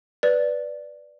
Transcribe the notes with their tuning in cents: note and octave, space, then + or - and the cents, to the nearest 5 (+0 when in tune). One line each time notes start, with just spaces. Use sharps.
B4 +0 D5 +0